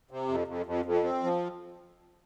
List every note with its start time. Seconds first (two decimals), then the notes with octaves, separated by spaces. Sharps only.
0.11 C3
0.28 F2
0.47 F2
0.66 F2
0.85 F2
1.04 C4
1.23 F3